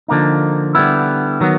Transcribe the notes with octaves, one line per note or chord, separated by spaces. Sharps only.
D3 F3 A#3 D#4
D3 G3 B3 E4
D#3 F#3 B3